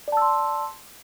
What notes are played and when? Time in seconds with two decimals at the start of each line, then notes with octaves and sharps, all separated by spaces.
0.08 D5
0.12 A5
0.17 E6
0.22 C6